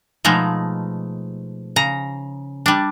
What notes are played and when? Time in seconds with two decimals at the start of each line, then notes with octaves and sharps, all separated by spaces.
0.25 B2 F3 G#3 A3 D#4
1.76 C#3 A#5
2.66 G3 D4